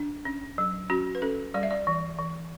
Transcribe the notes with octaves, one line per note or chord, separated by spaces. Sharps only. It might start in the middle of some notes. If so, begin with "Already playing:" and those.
Already playing: D4
C#4
F#3
C#4 F#4
B4
C#4 A4
G3 D5
E5
D5
E3
E3